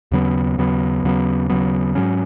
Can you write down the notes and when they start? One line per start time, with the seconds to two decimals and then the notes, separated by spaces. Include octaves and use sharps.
0.12 D#2 C#3 F#3 B3
0.58 D#2 C#3 F#3 B3
1.03 D#2 C#3 F#3 B3
1.49 D#2 C#3 F#3 B3
1.95 G#2 F#3 C#4